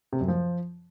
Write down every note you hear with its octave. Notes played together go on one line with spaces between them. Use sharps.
C3
F#2
F3